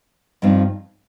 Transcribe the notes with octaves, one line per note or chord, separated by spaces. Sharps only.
G2 F3 C4 D#4